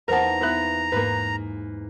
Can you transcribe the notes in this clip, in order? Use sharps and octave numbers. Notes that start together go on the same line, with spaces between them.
E2 A#3 D#4 A#4 C5 F#5 A5 A#5
B3 E4 F#6
G#2 A#3 B4